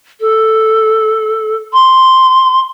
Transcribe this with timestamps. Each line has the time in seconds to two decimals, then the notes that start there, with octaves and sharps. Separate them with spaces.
0.20 A4
1.73 C6